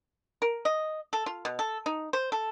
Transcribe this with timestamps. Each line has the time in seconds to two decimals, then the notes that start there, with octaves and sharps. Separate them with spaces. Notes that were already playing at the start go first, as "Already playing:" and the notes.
0.42 A#4
0.65 D#5
1.13 A4
1.26 F4
1.45 B2
1.59 A4
1.86 D#4
2.13 C5
2.32 A4